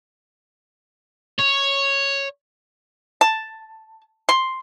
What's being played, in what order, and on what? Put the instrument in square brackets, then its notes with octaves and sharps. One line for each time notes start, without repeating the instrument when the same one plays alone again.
[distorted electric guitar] C#5
[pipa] A5
C6